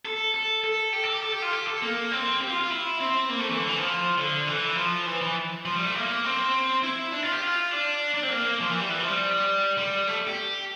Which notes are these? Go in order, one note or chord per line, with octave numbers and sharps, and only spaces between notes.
A4
A4
A4
G4
A4
G4
A4
G4
F4
G4
A4
A#3
C4
G4
F4
F4
E4
C4
A#3
A3
E3
D3
E3
F3
D3
E3
F3
E3
E3
F3
G3
A3
A#3
C4
E4
D4
F4
G4
F4
D4
D4
C4
A#3
F3
E3
G3
E3
F3
G3
G3
A3
G4